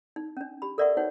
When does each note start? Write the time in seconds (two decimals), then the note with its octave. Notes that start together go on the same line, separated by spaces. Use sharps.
0.16 D#4
0.37 C#4 D4
0.62 G4 B5
0.78 A4 A#4 D5 E5 F#5 C#6
0.97 D#4 F#4 C5 C#5 F#5